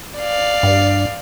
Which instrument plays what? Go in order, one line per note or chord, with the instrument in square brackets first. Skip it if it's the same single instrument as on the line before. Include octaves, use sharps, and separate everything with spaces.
[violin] D5 F5
[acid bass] G2